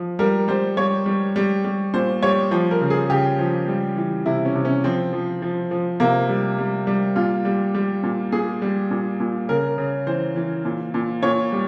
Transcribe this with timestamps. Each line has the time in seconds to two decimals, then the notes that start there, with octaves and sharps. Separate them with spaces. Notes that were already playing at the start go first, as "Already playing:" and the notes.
Already playing: F3
0.19 G3 A#4
0.48 G3 C5
0.77 G3 C#5
1.06 G3
1.36 G3
1.64 G3
1.94 A#2 C5
2.22 G3 C#5
2.51 F3 C5
2.71 A#4
2.81 C#3
2.90 G#4
3.10 C#3 G4
3.39 F3
3.68 G3
3.96 E3
4.26 C3 E4
4.45 C#4
4.55 C3
4.65 C#4
4.84 F3 C4
5.13 F3
5.42 F3
5.71 F3
6.00 C3 A#3
6.29 G3
6.58 G3
6.87 G3
7.16 A#2 F4
7.45 G3
7.74 G3
8.03 A#2
8.32 A#2 G#4
8.62 G3
8.91 A#2
9.20 A#2
9.48 C#3 A#4
9.78 C#3
10.07 E3 C5
10.36 E3
10.65 A#2
10.94 A#2
11.23 A#2 C#5
11.52 G3